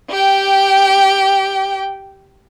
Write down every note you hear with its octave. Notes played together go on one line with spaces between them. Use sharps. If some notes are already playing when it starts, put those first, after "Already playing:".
G4 G5